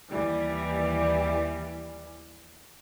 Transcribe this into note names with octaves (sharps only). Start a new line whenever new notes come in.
D#2 E3 G3